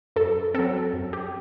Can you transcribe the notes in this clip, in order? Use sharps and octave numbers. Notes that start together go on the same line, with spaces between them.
F#2 A4
F#3 C4 A4
F#2
G4